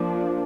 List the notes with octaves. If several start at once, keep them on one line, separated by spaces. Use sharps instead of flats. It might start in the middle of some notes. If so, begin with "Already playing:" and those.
Already playing: F3 A#3 D4